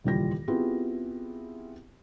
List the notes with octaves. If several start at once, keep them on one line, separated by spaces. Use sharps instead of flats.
D#1 C#2 E3 G3 F4 A#6
B3 C4 E4 F4 G4 G#4